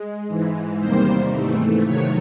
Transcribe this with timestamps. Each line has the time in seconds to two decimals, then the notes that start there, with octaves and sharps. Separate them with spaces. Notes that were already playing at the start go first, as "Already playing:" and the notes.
Already playing: G#3
0.28 G#2 E3 G#3
0.79 E2 C3 D#3 G3 A#3 C5
1.32 G#2 E3 A3
1.85 F2 C3 D#3 F#3 A3 C#5